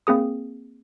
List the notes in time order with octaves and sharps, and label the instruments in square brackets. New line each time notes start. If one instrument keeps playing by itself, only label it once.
[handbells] A#3 C4 G#4 D#6